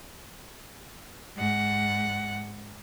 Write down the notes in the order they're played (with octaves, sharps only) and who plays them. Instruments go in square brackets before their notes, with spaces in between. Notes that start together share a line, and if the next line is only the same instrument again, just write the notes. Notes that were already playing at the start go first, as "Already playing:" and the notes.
[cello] G#2 F#5